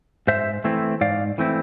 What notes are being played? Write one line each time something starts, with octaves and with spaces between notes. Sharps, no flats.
G#2 C5 E5
E3 A3 C4 E4
G#2 D5 F5
E3 A3 C4 E4